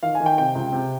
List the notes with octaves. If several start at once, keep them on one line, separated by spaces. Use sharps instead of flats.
D#3 F5
G#5
D#3
G5
C3 G5
C#2
C3